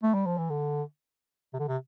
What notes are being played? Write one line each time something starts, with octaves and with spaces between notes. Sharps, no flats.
A3
G3
F3
E3
D3
C3
D3
C3